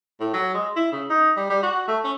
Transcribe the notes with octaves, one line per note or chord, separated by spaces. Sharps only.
A2
F#3
G#3
E4
C#3
D#4
G3
G3
F#4
A3
C#4